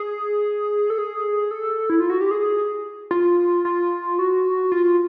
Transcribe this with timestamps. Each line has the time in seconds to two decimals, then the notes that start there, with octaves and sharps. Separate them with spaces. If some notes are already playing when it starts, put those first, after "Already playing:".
Already playing: G#4
0.90 A4
0.98 G#4
1.51 A4
1.90 E4
2.00 F4
2.10 F#4
2.21 G4
2.31 G#4
3.11 F4
3.65 F4
4.19 F#4
4.72 F4